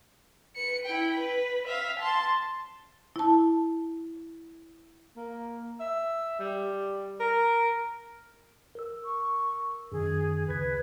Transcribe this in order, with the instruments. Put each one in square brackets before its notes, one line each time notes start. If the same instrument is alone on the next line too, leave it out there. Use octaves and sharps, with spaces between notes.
[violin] B4 C#7
E4 G5
B4
E5 F5
A5 C6
[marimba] E4 A5
[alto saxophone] A#3
E5
G3
A#4
[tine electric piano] A#4 E6
[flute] C#6
[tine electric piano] F#2 D#3 [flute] G#4
[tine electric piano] D2 C#3 G#6 [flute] B4